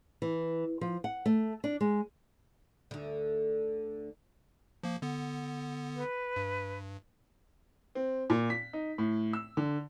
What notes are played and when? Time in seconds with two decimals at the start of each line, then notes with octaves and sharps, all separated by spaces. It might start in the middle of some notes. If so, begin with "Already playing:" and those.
0.22 E3
0.81 F3
1.04 F#5
1.26 A3
1.64 D4
1.81 G#3
2.91 D2 D3
4.83 F3 A#3
5.02 D3 B3
5.96 B4
6.36 G2
7.95 C4
8.30 A#2
8.50 B6
8.73 D#4
8.98 A2
9.33 E6
9.57 D3